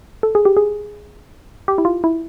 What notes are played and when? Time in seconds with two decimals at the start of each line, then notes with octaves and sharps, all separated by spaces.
0.23 A4
0.35 G#4
0.45 G4
0.57 G#4
1.68 G4
1.78 E4
1.85 F4
2.04 E4